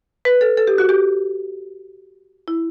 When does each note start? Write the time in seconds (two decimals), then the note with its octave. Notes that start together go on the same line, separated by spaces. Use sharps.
0.25 B4
0.41 A4
0.57 A4
0.67 G4
0.78 F#4
0.89 G4
2.48 E4